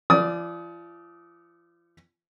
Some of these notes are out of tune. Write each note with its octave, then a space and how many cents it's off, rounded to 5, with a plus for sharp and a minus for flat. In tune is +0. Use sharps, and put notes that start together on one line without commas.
F3 -40 D5 +0 D#6 +25